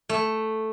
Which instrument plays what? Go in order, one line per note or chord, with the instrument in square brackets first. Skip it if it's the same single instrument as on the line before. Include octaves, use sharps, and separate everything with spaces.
[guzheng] A3